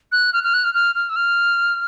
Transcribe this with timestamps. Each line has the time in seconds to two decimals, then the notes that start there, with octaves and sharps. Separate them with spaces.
0.12 F#6
0.33 F6
0.43 F6
0.54 F#6
0.64 F6
0.74 F6
0.95 F6
1.09 E6
1.16 F6